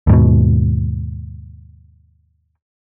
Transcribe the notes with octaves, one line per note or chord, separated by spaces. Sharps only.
D#2 G#2 B2